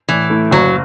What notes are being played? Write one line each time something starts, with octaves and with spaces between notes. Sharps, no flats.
A2 E3
A3 E4
F#1 F#3